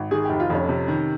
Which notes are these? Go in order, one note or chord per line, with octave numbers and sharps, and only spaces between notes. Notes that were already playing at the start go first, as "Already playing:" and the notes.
Already playing: G#1
D#3 G#4
F1 G4
F4
F2 C#4
C3
D#3